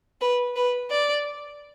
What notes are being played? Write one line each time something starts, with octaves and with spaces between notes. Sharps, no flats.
B4
B4
D5